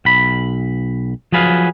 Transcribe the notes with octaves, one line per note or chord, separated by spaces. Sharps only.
B1 B5
F3 F#3 G#4 B4 F5